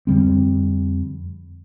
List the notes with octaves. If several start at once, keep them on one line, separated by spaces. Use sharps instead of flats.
F2 D3 G3 C4